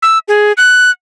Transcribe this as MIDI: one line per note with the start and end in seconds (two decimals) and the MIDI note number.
0.02 0.19 88
0.28 0.53 68
0.57 0.91 90